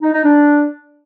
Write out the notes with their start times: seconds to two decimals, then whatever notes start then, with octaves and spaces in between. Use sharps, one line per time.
0.02 D#4
0.13 D#4
0.24 D4